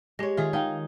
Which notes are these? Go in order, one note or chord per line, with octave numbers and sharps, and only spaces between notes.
G#3 G4 C#5 A#6
D#3 F4 G#4 E5
D#4 F5 G5